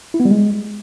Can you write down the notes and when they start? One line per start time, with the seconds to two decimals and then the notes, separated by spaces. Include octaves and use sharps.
0.14 E4
0.20 B3
0.25 G3
0.31 G#3